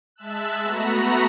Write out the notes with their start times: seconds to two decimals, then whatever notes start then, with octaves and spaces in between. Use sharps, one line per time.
0.16 G#3 E5 A5 E6 F#6
0.62 A3 B3 F#4 A#5 B5 A#6